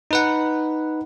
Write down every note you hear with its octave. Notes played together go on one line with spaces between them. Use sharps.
D#4 B4 F#5